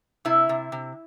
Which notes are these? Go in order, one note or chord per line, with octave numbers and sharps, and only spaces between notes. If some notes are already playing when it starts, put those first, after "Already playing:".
C3 E4
C3
C3